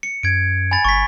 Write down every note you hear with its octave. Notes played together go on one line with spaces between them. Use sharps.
C#7
F#2 G#6 D7
G#5 B5 A6
G1 C#6 B6